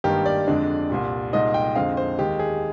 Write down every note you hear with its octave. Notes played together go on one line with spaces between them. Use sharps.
G#1 G2 D#3 A#3 D#4 G4
D5
F2 D3 G#3 D4
C2 A#2 G3
C2 A#2 G#3 D#4 D#5
G5
F2 D3 G#3 C4 F5
C5
D#2 D#3 G#3 G4
G#4